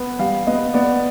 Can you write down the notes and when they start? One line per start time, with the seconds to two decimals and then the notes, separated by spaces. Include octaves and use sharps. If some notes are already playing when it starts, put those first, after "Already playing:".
Already playing: B3
0.19 G3 F5
0.47 B3 D#5
0.74 B3 D5